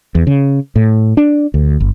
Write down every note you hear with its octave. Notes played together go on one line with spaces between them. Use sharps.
E2
C#3
A2
D4
D2
G1